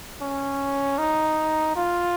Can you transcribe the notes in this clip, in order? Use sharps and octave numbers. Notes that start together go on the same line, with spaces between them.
C#4
D#4
F4